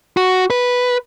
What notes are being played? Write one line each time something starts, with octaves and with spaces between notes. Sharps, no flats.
F#4
B4